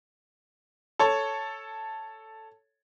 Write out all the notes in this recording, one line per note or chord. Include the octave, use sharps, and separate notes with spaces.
A4 C#5 A5